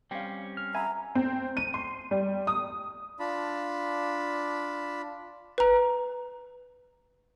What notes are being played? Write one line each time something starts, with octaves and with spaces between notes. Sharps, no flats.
G3 C4 C#4 F5 G5
F6
E5 F#5 G#5 A#5 B5
C4
D#7
C6
G3
D#6
D4 F4 A5 B5
B4 A#5